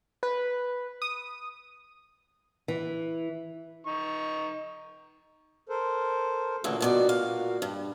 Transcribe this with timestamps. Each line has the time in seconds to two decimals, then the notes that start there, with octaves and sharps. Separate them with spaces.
0.23 B4
1.02 D#6
2.68 E3
3.87 D#4 C#6
5.69 A4 A#4 C5
6.64 D2 A#2 C#3 E3 A#3 F#4
6.81 G2 B2 D5
7.09 F5
7.62 G2